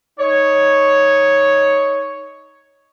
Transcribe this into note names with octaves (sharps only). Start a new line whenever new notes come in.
D#4 C#5